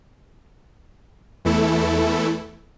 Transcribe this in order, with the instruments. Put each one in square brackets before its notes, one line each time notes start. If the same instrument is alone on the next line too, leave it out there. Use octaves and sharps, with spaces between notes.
[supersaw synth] E2 E3 A3 E4 A4